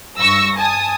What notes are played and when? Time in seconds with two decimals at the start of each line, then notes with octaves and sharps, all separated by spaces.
0.18 G2 C#6 E6 A#6
0.56 G#5 A5 D#6